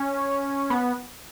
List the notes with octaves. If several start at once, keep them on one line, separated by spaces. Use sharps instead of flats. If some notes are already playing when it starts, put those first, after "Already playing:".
Already playing: C#4
B3